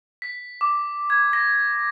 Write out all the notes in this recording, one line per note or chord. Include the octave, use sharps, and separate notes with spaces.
B6
D6
G#6
A#6